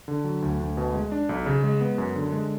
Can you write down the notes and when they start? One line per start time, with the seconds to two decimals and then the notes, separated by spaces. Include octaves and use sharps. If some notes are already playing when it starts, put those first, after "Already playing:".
0.08 D3
0.24 F#3
0.42 D2
0.60 D2
0.77 B2
0.94 G#3
1.12 D4
1.29 B1
1.46 C#3
1.64 G#3
1.81 B3
1.98 F#2
2.15 D3
2.33 G#3